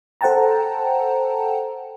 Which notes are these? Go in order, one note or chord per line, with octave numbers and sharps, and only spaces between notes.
A4 C5 F#5 G5 A5 A#5